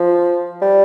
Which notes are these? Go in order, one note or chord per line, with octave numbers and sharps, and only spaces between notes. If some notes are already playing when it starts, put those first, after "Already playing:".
Already playing: F3
G3